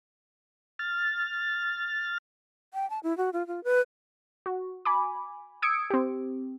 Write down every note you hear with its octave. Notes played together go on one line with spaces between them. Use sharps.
F6 A6
G5
A5
E4
F#4
F4
F4
B4
F#4
G#5 B5 D6
D#6 E6 G#6 C#7 D7
C4 G4